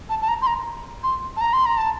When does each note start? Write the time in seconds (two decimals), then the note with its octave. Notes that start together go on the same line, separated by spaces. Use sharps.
0.09 A5
0.21 A5
0.28 A#5
0.42 C6
0.47 A#5
1.03 C6
1.36 A5
1.41 A#5
1.53 C6
1.66 A#5
1.77 A5